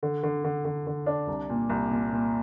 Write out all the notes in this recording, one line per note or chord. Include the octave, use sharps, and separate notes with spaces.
D3
D3
D3
D3
D3
D4
C2
A#2
C2
A#2
A#2